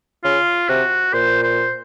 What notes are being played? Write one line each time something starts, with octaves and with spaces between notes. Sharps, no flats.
C#3 F4
C3 F#4
A#2 C5
C5